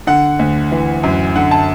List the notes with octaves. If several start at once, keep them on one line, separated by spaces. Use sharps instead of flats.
D3 F#5
D2
E3
F#2
D3 F#5
A5